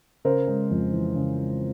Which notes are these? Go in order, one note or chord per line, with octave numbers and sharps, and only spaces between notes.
C#3 A#4 C5
G#3
F2
E3
C#3
G#3